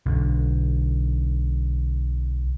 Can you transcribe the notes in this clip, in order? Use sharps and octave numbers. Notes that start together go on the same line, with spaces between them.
B1 D3